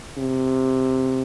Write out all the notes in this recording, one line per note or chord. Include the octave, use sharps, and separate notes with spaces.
C3